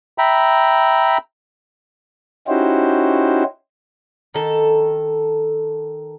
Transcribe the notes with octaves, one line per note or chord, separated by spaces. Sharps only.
E5 G5 A#5 B5
C#4 D#4 E4 F#4 G4 C5
D#3 A4